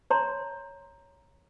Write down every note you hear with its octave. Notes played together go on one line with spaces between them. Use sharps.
C#5 A#5 C6